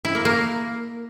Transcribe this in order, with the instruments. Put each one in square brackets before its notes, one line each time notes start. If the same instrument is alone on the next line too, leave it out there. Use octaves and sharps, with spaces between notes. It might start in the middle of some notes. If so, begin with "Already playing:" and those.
[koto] E4
A#3
A#3